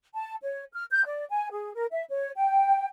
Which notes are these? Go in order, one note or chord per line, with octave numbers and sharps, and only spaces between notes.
A5
C#5
F6
G6
D5
G#5
G#4
A#4
E5
C#5
G5